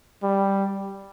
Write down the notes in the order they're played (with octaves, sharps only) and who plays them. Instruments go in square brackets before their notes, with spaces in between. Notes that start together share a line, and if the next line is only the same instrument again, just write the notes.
[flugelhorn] G3